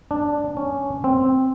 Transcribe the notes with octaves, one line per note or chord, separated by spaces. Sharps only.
D4
C#4
C4